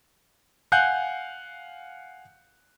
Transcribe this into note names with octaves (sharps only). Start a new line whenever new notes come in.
F5 F#5 G#5 F#6 G6